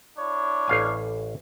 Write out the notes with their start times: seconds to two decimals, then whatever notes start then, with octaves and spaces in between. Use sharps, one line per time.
0.19 D4 E4 C#5
0.68 A1 F5 G#5